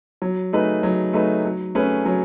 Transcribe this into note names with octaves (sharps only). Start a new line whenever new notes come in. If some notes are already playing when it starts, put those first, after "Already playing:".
F#3
A3 D#4 G#4 B4
F#3
A3 D#4 G#4 B4
F#3
A3 C#4 G#4 B4
F#3